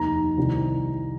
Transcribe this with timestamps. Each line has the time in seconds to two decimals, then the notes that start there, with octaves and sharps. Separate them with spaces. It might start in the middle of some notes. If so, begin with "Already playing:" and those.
Already playing: F1 D#2 D#3 A#5
0.37 C2 C3 D#3